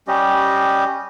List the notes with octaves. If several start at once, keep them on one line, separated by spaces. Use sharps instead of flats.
G3 C#4 G4 D#5